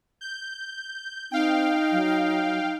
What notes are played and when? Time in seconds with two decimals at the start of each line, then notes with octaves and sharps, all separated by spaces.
0.21 G6
1.32 C4 D#4 F5 G5
1.92 F#3